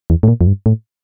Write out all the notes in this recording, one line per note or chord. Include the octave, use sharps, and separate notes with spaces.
E2
A2
A#2
F2
G2
A2